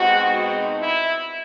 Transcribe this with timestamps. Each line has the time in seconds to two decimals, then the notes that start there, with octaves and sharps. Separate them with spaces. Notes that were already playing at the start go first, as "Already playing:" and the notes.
Already playing: B2 G#3 C4 D#4 F#4
0.38 D#4
0.78 E4